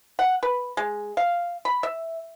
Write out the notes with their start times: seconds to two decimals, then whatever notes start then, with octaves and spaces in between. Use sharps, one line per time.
0.19 F#5
0.43 B4
0.77 G#3
1.17 F5
1.65 B5
1.83 E5